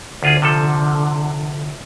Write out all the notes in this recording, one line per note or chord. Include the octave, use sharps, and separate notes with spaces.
D2 D3 F4 G#4
C3 F3 A4